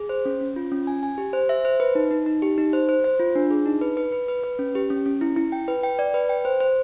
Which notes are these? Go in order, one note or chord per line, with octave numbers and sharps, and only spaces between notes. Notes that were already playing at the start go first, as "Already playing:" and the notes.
Already playing: G#4
C5
C#4
C#4
F4
C#4
G#5
G#5
G4
C5
E5
C5
B4
D#4
D#4
D#4
G4
D#4
C5
C5
C5
F4
D4
G#4
D#4
B4
B4
B4
B4
B4
C#4
G4
C#4
C#4
E4
E4
G5
B4
G5
D5
B4
G5
C5
C5